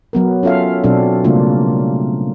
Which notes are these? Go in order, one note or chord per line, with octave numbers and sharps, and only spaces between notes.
F#3 B3 A#4
C#4 F4 A4 E5 F5
B2 F#3 C4 D4 A4
C#3 G3 A3 A#3 D4 F4